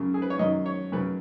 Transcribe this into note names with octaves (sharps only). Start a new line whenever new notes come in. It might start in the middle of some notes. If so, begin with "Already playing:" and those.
Already playing: F#2 C#3
G#4
B4
C#5
F#2 D#3 D#5
C#5
F#2 C#3 B4